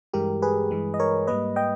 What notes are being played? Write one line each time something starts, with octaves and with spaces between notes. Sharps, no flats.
G2 E3 G#3 G4 A#4
G#4 B4
G2 E3 G#3
D#5
A#4 C#5
G#2 G3 A#3 B4 D#5
D#5 G5